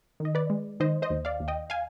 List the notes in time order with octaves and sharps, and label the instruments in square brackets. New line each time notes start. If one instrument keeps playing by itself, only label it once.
[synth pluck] D#3
D#5
B4 D5
G#3
D#3 C5 D#5
C5 D#5
D#2
D5 F5
D#2
D#5 G5
F5 G#5